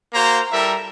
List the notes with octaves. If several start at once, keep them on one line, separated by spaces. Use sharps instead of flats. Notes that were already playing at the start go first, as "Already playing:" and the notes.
A#3 F#4 C5 A#5
G3 E4 A4 A#4 E5